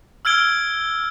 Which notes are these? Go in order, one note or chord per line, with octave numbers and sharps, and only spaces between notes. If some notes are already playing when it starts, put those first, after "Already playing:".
E6 F6 G#6 D7 G7